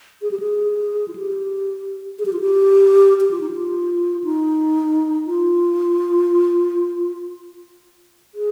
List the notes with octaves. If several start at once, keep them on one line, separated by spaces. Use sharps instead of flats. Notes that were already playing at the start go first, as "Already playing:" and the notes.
G#4
G4
G#4
F4
G4
G#4
G4
F4
G4
G4
F4
D#4
F4
D#4
F4
G#4